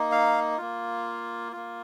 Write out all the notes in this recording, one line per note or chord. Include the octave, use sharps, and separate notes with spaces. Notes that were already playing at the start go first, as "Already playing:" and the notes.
Already playing: A#3 D#4
F5
A#3 F4
A#3 F4